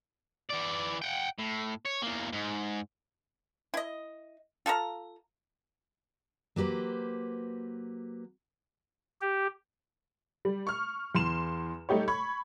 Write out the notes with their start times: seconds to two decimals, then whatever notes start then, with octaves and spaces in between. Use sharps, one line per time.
0.49 E3 D5
1.02 F#5 G5
1.39 A2
1.86 C#5
2.02 E2 A#3
2.33 G#2
3.74 E4 D#5
4.66 F4 A4 F5 A#5
6.56 F#3 A#3 G4 B4 C5
9.21 G4
10.45 G3
10.67 C#6 F6
11.15 E2 C6 E7
11.89 G3 A3 D#4 G4 C#5
12.08 B5 C#6 G#6